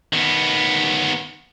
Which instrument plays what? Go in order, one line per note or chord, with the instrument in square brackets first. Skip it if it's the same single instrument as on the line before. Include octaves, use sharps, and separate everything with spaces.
[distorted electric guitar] D#3 B3